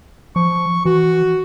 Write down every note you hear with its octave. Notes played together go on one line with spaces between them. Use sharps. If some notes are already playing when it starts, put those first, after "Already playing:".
F3 C#6
E3 F#4